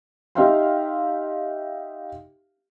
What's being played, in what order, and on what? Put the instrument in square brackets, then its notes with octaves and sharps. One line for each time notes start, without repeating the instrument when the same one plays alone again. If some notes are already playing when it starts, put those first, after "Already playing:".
[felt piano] D#4 G4 E5 F5 G5 C6